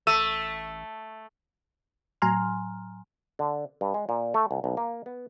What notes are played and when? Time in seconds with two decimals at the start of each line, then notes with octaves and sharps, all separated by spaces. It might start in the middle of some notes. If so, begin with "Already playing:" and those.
0.07 A1 A3 E6 D#7
2.22 A2 F#3 G#5 A#5 C6 F6
3.39 D3
3.81 G2
3.94 G#3
4.09 A#2
4.34 A3
4.51 C2
4.64 B1
4.77 A#3
5.06 B3